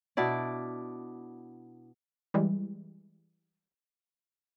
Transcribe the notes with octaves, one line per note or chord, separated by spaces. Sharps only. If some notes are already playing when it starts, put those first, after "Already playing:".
B2 D4 E4 D5
E3 G3 G#3